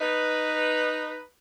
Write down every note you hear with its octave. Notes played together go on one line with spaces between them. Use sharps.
D#4 B4